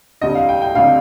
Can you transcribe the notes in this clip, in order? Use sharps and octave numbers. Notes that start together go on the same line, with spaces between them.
D2 C3 G3 D#5
F5
G5
G5
D2 C3 G3 F5